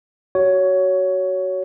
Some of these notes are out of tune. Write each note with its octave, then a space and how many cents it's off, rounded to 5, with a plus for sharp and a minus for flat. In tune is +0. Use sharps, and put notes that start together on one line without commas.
F#4 +20 C#5 +10